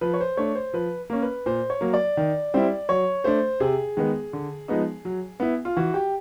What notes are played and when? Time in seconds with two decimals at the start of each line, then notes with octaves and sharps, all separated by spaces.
0.01 F3 B4
0.14 C#5
0.20 C5
0.37 A3 D4 C#5
0.55 C5
0.73 F3 B4
1.10 A#3 C#4
1.22 B4
1.46 A#2 C5
1.70 C#5
1.81 F#3 A#3
1.94 D5
2.17 D#3
2.54 G3 C4 E4
2.89 F#3 C#5
3.24 A3 D4 C5
3.60 C3 G#4
3.97 D#3 G#3 B3
4.33 D3
4.68 F3 G#3 B3 D#4
5.05 F#3
5.40 B3 E4
5.65 F4
5.77 E3 F#4
5.94 G4